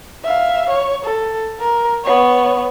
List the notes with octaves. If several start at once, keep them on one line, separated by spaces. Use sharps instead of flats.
E5 F5
C#5
A4
A#4
B3 C#5